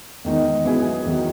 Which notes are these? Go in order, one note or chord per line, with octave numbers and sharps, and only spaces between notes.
E2 D#3 G#3 D#4
F#3 B3 E4 G#4
E2 D#3 F#3